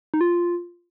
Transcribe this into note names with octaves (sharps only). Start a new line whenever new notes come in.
D#4
F4